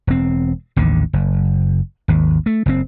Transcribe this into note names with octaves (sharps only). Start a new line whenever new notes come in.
E1 C4
A1 D#2 D3
F#1
G#1 D#2
A3
F#1 A#2 C4